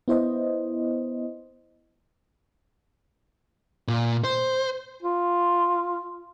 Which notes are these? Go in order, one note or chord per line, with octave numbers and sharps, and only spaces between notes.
B3 E4 C5 D#5
A#2
C5
F4